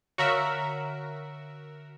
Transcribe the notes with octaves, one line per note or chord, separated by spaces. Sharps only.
D3 F#4 A#4 C#5 E5 F5